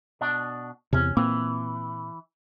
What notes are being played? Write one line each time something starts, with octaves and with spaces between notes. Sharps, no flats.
B2 D4
E2 C3 C#4
A#2 E3 A#3 C4